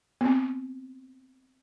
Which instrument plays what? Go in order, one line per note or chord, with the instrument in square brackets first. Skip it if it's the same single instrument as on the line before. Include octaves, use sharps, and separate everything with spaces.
[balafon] B3 C4